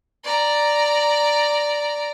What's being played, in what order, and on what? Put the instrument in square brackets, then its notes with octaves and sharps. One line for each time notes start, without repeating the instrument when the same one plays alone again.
[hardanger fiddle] D5 A#5